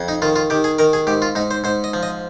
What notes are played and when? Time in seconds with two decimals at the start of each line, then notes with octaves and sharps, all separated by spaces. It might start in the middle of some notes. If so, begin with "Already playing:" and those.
Already playing: F2
0.08 D#4
0.22 D#3 F4
0.36 F4
0.50 D#3 G4
0.64 G#4
0.79 D#3 A#4
0.93 G#4
1.07 G#2 G4
1.22 F4
1.35 G#2 D#4
1.51 C5
1.64 G#2 C5
1.84 D#5
1.94 F3
2.03 D#5